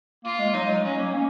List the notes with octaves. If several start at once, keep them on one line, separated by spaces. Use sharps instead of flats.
A#3 F4
G#3
F#3 D#4
G#3
G#3
F#3 C#4
A#3
C#4